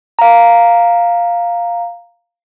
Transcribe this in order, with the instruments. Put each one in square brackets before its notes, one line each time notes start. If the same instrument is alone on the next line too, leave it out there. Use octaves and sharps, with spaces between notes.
[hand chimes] F5 A#5